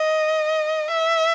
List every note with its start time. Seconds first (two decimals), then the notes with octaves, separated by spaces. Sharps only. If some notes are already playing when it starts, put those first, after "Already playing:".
Already playing: D#5
0.92 E5